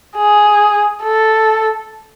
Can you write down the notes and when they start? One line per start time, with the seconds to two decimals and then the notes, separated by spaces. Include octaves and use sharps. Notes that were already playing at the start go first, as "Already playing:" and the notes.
0.17 G#4
1.04 A4